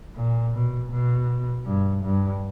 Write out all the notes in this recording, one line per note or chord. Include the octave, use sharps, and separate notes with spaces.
A#2
B2
B2
G2
G2